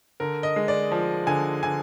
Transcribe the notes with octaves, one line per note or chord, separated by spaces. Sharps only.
D3 A#4
D#5
G#3
D5
F3
D3 G#5
D3 G#5